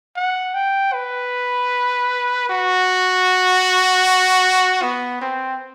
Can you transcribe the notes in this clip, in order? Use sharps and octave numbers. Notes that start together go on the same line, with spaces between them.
F#5
G5
B4
F#4
B3
C4